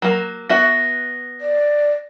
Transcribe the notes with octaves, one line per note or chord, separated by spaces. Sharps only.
F#3 A#3
B3 F#4 E5 A#6
D5